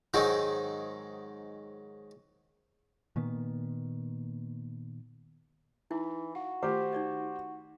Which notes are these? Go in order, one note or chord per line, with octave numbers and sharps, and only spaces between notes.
G#2 D#3 F#3 G#3 C4 D#4
A#2 D#3 A#3 B3
E3 D#4 E4
F#4 F5
D#3 A3 F4 G4 C5 D6
D#4 D5 D#5